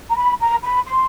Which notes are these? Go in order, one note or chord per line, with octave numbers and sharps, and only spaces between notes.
A#5
B5
A#5
B5
C6